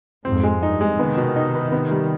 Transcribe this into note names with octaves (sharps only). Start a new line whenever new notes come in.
F2 G#2 C4
G#3
G2 D#4
G#3
C3 D#3 B3
B2
D#4
B4
B3
G3